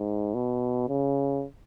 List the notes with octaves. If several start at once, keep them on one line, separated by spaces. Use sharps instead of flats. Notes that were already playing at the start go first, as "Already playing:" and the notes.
Already playing: G#2
B2
C#3